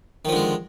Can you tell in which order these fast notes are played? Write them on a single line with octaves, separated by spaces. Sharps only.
D#3 F3 D3 G#3